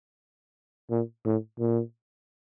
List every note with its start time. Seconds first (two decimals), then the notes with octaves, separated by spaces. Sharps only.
0.91 A#2
1.25 A2
1.60 A#2